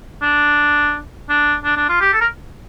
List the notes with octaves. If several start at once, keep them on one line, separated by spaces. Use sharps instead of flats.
D4
D4
D4
D4
F4
G4
A4
A#4